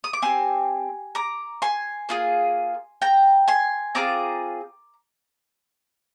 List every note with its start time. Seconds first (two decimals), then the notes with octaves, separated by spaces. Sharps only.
0.04 D#6
0.13 D6
0.22 C4 G4 G#5 C6
1.15 A#5 D6
1.62 G#5 C6
2.09 A#3 F4 G#4
3.02 G5 A#5
3.48 G#5 C6
3.95 C4 F4 G#4 A#5 D6